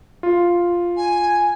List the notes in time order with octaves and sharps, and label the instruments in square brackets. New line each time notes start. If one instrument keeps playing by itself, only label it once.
[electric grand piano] F4
[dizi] G#5